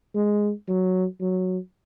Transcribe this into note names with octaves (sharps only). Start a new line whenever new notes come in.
G#3
F#3
F#3